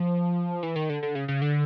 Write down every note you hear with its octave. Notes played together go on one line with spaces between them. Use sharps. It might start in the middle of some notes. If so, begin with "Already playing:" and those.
Already playing: F3
E3
D#3
D3
D3
C#3
C#3
D3